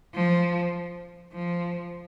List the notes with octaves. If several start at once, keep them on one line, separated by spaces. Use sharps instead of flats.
F3
F3